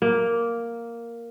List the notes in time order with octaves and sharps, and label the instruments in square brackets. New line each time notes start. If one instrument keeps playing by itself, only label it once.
[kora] A#3